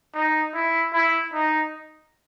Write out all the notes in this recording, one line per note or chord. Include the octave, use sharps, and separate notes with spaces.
D#4
E4
E4
D#4